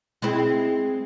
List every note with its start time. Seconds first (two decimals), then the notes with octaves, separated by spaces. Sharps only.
0.22 G#3 C4 E4